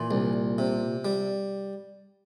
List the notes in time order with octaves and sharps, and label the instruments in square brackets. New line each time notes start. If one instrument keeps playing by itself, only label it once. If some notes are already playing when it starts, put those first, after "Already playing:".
Already playing: [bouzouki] A#2 [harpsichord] E3
[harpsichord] C2
C3
G3